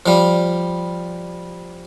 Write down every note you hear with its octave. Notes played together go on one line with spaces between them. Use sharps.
F3 G3